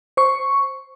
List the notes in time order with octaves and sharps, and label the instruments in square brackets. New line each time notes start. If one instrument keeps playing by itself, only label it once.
[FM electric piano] C5 C#6